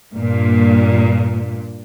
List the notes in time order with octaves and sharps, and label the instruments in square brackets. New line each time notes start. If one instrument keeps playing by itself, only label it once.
[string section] G2 A#2